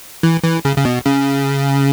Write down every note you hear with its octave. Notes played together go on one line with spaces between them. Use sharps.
E3
E3
C#3
C#3
B2
C#3